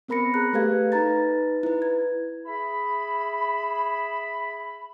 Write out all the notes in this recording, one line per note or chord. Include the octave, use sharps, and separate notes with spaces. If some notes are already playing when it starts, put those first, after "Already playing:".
B3 C4 A#4 B5 A#6 C#7
G#4 A#5 F#6
A3 G4 A4 B4 F5 G#6
D#4 B4 A#5 A6
E4 B4
G#6
G#4 E5 B5